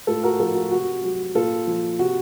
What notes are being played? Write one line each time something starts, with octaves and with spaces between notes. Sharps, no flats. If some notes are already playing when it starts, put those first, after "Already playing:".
A2 F4 A4
F#4 A#4
F3 F4 A4
F#4
C3 F#4
F#3
A#2 F4 A4
F3
C3 F#4